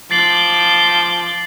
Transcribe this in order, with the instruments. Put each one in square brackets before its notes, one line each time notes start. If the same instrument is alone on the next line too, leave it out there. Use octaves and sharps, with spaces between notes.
[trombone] F3 [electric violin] D6 G6 [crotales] A6 C7 F#7